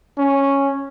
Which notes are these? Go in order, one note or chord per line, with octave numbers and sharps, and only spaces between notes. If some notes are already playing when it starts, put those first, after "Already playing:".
C#4